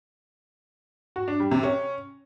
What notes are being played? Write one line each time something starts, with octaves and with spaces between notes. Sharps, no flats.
F#4
D4
G3
C3
C#4